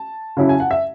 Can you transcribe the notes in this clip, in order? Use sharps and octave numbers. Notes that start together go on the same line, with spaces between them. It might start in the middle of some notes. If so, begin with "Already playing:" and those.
Already playing: A5
C#3 F#3 C#4 E4
G#5
F#5
E5